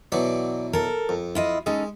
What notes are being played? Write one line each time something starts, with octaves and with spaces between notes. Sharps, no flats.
B2 E3 F#3 D5
A4 A#4
F2
E4 F4 D#5
G#3 C#4 D#4 A4